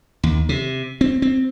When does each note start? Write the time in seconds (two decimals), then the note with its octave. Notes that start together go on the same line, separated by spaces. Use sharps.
0.23 D#2
0.49 C3
1.01 C4
1.22 C4